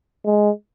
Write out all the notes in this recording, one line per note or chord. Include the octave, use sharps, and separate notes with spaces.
G#3